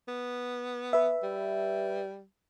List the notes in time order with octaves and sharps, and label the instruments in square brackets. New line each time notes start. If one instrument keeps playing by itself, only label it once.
[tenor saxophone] B3
[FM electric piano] B4 E5
[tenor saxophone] G3